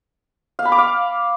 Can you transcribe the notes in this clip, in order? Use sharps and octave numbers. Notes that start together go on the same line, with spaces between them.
F5
B5
D6
F5